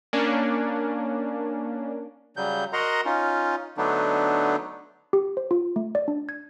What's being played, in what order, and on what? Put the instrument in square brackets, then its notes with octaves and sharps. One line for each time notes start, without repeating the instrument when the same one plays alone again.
[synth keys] A#3 C#4 D4
[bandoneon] C#3 F#3 G3 G6
F#4 A#4 D#5 F#5 A#5 C6
C#4 D#4 F4
D3 F#3 A3 B3 D4 D#4
[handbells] G4
C5
F4
A3
D5
D4
G#6